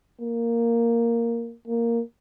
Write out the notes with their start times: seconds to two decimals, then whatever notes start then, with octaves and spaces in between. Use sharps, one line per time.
0.21 A#3
1.68 A#3